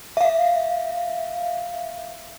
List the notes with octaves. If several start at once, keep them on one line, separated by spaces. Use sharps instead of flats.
E5 F5